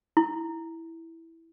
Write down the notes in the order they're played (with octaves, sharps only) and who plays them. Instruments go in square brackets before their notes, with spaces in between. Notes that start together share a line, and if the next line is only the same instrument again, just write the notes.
[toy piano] E4